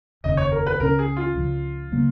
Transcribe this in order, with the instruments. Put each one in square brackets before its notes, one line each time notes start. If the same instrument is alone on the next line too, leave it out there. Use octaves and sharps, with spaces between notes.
[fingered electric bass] F1 D#2 C#3 [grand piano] D#5
[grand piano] C#5
A#4
B4
[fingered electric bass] C#2 C#3 F#3 C#4 [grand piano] A#4
[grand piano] G#4
F4
[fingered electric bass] C#2 C#3 F3
C#3 F#3 A#3